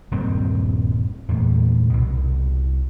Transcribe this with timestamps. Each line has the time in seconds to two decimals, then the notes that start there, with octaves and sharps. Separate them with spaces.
0.11 D#1 G2 A#3 C4
1.28 E2 A#2 A3
1.90 C2 B2